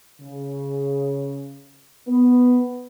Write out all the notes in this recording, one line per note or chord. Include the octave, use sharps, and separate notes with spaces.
C#3
B3